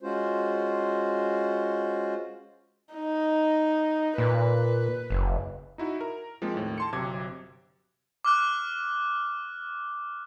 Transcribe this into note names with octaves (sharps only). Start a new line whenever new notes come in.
G#3 C#4 F4 F#4 C5
D#4
A#2 B4
F#1
D#4 E4 F#4
A#4
F3 G#3 A#3 C4
D#2 A2
A5 C6 C#7
G1 C3 F#3 D6 G#6
D6 F6 F#6